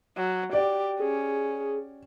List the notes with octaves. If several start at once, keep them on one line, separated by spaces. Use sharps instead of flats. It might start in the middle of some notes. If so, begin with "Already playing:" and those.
F#3
G4 D5
C#4 G#4